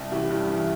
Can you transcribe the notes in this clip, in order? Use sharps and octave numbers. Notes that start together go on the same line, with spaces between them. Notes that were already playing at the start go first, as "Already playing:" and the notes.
Already playing: C2
A1 E4 G4
G2
E3